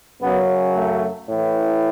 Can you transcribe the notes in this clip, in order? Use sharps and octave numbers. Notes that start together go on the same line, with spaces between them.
F#2 C#3 F#3 B3
A3
A2 E3